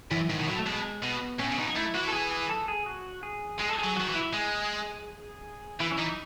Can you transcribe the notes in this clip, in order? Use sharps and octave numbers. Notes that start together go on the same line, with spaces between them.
F#2 E3
G#2 D#3
B2
A2 F#3
A3
B2 G#3
B2 B3
A2 C#4
C#3
B2 D#4
A3 E4
E3 F#4
A4
G#4
G#4
A4
G#4
F#4
G#4
G#3 G#4
A4
G#4
F#3
D#3 F#4
E3
E4
G#3 G#4
E3 E4
C#4
E3 D#4